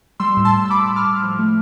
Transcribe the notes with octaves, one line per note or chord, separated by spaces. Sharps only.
G3 C6 E6
A2
A5 C6
A2
E6
A2 B5 D6
A2 E6
D6 F6
A2
F3
A3